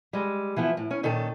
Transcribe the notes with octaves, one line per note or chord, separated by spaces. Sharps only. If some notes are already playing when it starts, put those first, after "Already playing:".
G3 G#3
E3 F3 B3 E4
A2
C#4
A#2 D#3 C#4 A4